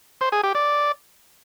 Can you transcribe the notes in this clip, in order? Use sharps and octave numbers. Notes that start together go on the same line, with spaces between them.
C5
G#4
G4
D5